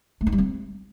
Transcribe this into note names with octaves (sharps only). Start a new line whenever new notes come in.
A3
D#4
G3
C4